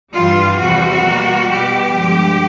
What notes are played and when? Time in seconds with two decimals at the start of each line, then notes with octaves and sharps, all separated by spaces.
0.12 G2 E3 G3 F4
0.57 E2 C3 E3 G3 F#4
1.03 B2 G3 A#3
1.49 E2 B2 G3 B3 G4
1.94 G2 D3 F3 G#3